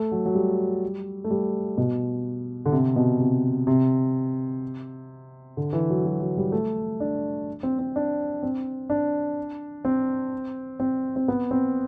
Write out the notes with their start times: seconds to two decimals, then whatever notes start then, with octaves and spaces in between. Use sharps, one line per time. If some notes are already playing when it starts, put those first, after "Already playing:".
Already playing: A3
0.12 F#3
0.26 F#3
0.35 G3
1.24 A3
1.31 G3
1.78 B2
2.66 D3
2.72 C3
2.96 B2
3.19 C3
3.67 C3
5.57 D3
5.73 E3
5.90 F#3
6.06 F#3
6.21 F#3
6.37 G3
6.52 A3
7.00 D4
7.63 C4
7.79 C4
7.96 D4
8.43 C4
8.90 D4
9.85 C4
10.80 C4
11.16 C4
11.28 B3
11.51 C4